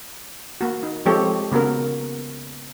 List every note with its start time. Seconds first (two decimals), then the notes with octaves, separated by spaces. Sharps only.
0.61 A#3 F#4
0.83 D#4
1.06 F3 G#3 C4 G4 A4 C#5
1.51 C#3 A#3 B3 F#4 A#4